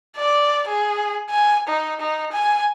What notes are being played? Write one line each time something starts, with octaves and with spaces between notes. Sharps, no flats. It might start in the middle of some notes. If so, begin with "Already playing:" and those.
D5
G#4
G#5
D#4
D#4
G#5